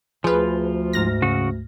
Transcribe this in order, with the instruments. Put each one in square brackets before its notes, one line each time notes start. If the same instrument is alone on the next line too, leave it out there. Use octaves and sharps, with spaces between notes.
[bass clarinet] D2 [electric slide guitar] F3 F4 [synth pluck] G#4 B4
[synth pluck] G#2 F6 A#6
[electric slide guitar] C#3 F#4